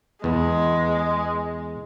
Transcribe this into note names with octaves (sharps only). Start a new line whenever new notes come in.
E2 G#3 B3